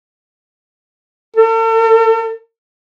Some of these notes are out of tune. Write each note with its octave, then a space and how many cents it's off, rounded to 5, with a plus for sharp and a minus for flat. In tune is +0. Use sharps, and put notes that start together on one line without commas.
A4 +45